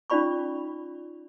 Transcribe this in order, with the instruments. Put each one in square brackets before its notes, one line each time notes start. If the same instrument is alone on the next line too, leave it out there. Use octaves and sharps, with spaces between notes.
[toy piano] C#4 D#4 F4 D5 B5 C#6